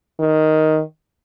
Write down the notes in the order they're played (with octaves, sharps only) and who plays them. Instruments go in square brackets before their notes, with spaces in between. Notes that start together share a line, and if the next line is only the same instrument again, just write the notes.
[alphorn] D#3